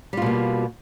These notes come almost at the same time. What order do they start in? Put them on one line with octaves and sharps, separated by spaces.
G3 F4 B2 A#3